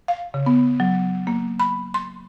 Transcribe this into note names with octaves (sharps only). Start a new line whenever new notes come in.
F5
C#3
B3
F#3
A#3
B5
C6